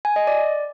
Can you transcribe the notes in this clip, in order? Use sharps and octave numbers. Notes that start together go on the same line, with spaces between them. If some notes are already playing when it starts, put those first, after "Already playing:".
G#5
D#5
D5